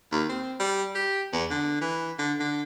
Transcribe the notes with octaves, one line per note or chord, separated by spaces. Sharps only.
D#2
C4
G3
G4
E2
D3
E3
D3
D3